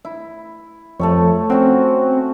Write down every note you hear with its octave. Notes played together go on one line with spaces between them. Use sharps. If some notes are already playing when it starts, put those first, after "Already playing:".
E4
F2 A3 A4 C#5
C4 C#4 F#4